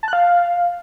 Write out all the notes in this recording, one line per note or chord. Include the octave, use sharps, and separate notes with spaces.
A5
F#6
F5